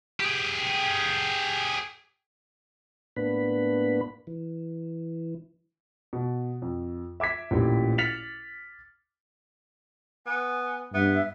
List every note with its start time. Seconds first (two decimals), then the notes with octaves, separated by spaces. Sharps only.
0.20 G4 G#4
3.16 A2 A#3 B3 D4 B4 B5
4.27 E3
6.13 B2
6.62 F2
7.20 E5 D6 G#6 B6
7.51 A1 D2 A#2 G4
7.98 F6 A6 B6 C#7 F7 F#7
10.26 B3 G#5
10.94 G2 B3 E5